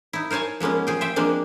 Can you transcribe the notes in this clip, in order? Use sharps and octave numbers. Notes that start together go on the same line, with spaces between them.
D#4 E4
A#4 C5 C#5 G#5 A5
F3 G#3 A#3 B3 C#4
F3 G#4 G5
C5 E5 G5
F3 G#3 A#3 C4 D4